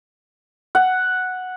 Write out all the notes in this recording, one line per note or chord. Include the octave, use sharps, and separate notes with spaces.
F#5